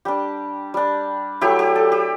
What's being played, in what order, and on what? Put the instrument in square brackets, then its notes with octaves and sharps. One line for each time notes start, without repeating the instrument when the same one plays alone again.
[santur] G3 D4 G4
G3 D4
F#3 A3 E4 G4
G4
A4
G4